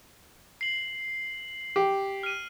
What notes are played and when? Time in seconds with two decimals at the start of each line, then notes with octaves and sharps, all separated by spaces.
0.61 C7 F#7
1.76 G4
2.23 F6 D#7